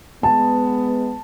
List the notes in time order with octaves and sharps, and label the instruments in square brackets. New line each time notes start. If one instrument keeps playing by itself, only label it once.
[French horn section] G#3 B3 [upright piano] A5